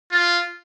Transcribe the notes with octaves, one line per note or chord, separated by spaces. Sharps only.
F4